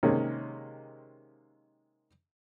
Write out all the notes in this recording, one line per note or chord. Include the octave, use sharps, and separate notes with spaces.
C3 D#3 G#3 A#3 C#4